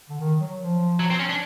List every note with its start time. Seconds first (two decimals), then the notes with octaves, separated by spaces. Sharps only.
0.10 D3
0.20 D#3
0.40 F#3
0.60 F3
1.00 F#3
1.10 C4
1.19 C#4
1.29 D4